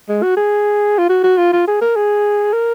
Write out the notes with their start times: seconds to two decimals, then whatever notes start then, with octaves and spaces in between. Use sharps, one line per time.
0.09 G#3
0.23 F#4
0.37 G#4
0.98 F4
1.10 F#4
1.24 F#4
1.38 F4
1.53 F4
1.68 G#4
1.81 A#4
1.96 G#4
2.53 A#4